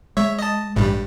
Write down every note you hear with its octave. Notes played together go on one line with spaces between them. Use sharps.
G#3 C#5 E5
D#5 A5
A1 G2 G3